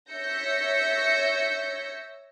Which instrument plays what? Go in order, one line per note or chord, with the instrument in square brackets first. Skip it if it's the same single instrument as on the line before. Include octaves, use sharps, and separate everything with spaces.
[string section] C#5 E5 E6 G6 A#6 C#7